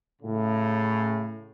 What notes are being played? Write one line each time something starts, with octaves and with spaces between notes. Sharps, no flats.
A2 C#3